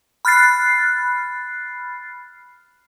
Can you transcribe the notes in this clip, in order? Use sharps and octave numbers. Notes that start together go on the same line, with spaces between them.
B5 F6 F#6 A6 C7